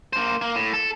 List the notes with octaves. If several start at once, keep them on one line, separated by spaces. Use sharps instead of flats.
A#3 C5
A#3
A2
A4